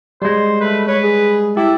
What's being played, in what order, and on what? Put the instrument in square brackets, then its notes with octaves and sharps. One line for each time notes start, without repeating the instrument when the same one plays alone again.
[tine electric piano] G3 G#3 [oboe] C5
[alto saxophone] A3 [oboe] B4
[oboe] B4 [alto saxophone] C#5
[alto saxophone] G#4
[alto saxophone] E4 [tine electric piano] G4 [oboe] A4